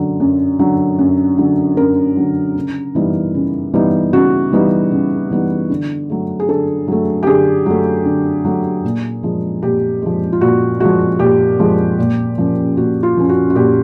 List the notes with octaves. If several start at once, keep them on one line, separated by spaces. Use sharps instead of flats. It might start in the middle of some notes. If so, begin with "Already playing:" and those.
Already playing: F#2 D3 F#3
F#2
D3 F#3
F#2
D3 F#3
F#2 A#4
D3 F#3
C#3
E3 G3 B3 D#4
C#3
E3 G3 B3 D#4
C#3 F#4
E3 G3 B3 D#4
C#3
E3 G3 B3 D#4
D3
F#3 A3
G#4
D3 A4
F#3 A3
G4
D3 G#4
F#3 A3
D3
F#3 A3
A#2
F3 G#3
A#2 G4
F3 G#3
F4
A#2 F#4
F3 G#3 F#4
A#2 G4
F3 G#3
A#2
F3 A#3 C#4
A#2 F#4
F4
F3 A#3 C#4
F#4
F#4
A#2 G4